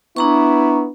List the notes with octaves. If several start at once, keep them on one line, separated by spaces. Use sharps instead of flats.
B3 D4 E4 A#5 C#6